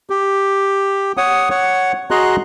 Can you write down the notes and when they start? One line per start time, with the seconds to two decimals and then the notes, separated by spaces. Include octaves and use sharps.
0.10 G4
1.17 C#5 F#5 D#6
1.50 C#5 F#5
2.11 F#4 G#4 D#5 A#5 C6 F#6